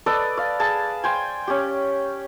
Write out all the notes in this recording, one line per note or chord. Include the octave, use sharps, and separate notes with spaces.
A4 B4 D5 D#5
D5 F5
G#4 A5
C5 G5 G#5
C#4 G4